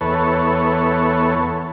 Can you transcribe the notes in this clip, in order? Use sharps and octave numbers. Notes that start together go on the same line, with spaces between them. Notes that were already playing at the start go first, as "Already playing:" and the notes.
E2 B3 A4 C#5